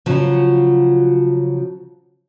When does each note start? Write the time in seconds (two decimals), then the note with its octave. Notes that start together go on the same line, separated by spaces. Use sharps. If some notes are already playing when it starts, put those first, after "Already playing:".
0.06 C#3 F3 F#3